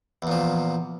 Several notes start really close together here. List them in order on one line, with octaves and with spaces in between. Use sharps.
E2 A#2 F3